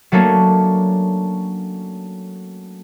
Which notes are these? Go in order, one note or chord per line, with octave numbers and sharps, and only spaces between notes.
F#3 A3 A#3 C#4 D4